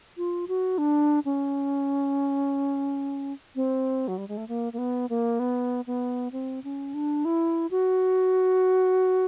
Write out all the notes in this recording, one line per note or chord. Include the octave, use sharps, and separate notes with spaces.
F4
F#4
D4
C#4
C4
F#3
G3
G#3
A3
A#3
A#3
B3
A#3
B3
B3
C4
C#4
D4
E4
F#4